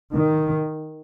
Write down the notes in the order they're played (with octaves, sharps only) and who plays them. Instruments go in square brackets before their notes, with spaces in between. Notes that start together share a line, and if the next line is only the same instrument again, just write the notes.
[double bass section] D#3